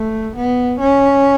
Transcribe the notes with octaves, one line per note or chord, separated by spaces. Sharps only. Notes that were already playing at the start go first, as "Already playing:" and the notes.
Already playing: A3
B3
C#4